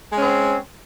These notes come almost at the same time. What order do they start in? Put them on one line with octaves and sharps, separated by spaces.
G#3 C#4 C4